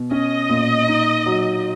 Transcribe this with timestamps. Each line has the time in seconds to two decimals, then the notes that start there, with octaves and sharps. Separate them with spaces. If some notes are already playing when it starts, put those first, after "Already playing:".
Already playing: B2
0.11 C#4 D#5
0.49 A#2
0.87 D#4
1.26 F#3